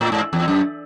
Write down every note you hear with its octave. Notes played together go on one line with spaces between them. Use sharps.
A2
G#2
E2
F#2